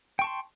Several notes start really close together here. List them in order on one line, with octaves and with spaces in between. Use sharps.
G5 C#6 A5 C6